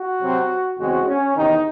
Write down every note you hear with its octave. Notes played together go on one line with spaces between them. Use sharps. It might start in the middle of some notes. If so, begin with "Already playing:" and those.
Already playing: F#4
C3 F#3 C4
E2 C#3 G#3 C4 F#4
C#4
E2 C3 D#3 D#4